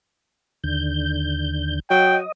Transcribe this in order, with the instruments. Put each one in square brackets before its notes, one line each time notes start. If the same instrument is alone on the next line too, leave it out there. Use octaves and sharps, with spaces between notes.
[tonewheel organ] D#2 D3 G6
[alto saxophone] F#3 [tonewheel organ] D#5 [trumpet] G5